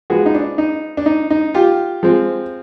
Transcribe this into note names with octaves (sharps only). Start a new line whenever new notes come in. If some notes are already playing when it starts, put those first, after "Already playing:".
F3 G#3 B3 F#4 G#4
D#4
D4
D#4
D4
D#4
D#4
F4 G4
F3 G#3 C4